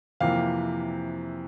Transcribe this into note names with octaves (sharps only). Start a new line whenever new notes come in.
F2 C3 E3 A#3 F5